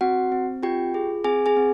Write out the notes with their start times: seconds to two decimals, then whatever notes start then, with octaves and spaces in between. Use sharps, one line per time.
0.01 C4 F#4 F#5
0.32 C4
0.63 F4 G4 G5
0.94 G#4
1.24 C4 G#4 G#5
1.46 G#4 G#5
1.57 C4